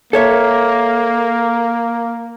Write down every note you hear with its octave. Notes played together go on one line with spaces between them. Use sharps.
A#3 A4 C#5 E5